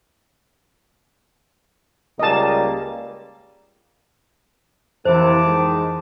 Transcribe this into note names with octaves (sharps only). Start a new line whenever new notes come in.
C#2 G3 A#3 D#5 A5
F2 C3 E3 A#3 E4 C5 A5 D6
G#2 D#3 G#3